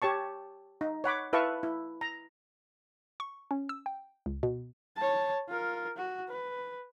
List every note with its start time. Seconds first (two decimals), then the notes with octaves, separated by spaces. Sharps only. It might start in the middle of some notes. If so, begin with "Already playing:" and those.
0.02 G4 C#5 A5 C#6
0.81 D#4
1.04 C#5 F#5 B5 D6
1.33 E4 B4 E5 F5 A5 C#6
1.63 E4
2.01 A#5
3.20 C#6
3.51 C#4
3.69 E6
3.86 G5
4.26 C#2
4.43 B2
4.97 C#5 A5
5.49 F4 A#4
5.97 F#4
6.29 B4